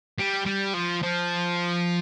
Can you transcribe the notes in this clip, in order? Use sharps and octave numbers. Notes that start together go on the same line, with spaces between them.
G3
G3
F3
F3